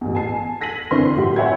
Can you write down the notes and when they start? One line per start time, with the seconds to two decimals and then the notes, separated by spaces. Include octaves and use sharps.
0.01 A1 E2
0.15 G#5 A5 C7
0.61 G#6 A#6 B6 D#7 F#7
0.91 D3 E3 C4 D4 A#4 C6
1.16 A2 F#3 F#4 G4
1.36 C#5 E5 F#5 G5 B5 G#6